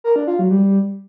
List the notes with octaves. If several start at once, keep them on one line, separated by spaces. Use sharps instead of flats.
A#4
D4
F4
F#3
G3